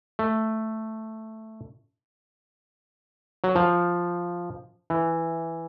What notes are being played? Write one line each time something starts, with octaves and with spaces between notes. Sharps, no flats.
A3
F#3
F3
E3